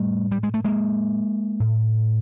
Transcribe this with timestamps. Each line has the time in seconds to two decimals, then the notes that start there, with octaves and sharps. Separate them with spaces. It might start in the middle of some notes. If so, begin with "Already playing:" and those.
Already playing: A2 G3 A3
0.31 G3
0.43 G#3
0.54 A3
0.65 G#3 A#3
1.60 A2